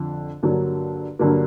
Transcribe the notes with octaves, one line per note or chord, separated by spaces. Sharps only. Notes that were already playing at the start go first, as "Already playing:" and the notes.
Already playing: F2 D3 F3
G2 D3 F#3 A#3
G2 D3 F#3 A#3